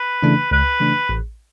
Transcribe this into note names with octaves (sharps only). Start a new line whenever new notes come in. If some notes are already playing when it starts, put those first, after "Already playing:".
Already playing: B4
C#3 E3 A3 D4
C#2 B4
C#3 E3 A3 D4
A1